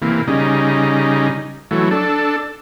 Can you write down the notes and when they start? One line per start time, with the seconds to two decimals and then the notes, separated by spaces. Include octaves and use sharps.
0.02 C3 E3 A#3
0.28 C#3 G3 D#4
1.71 E3 F#3 A3
1.91 D4 A4